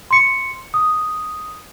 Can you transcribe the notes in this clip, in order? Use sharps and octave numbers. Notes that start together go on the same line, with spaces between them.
C6 C#7
D#6